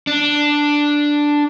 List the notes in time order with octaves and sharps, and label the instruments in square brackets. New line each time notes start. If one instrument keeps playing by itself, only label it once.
[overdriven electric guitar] D4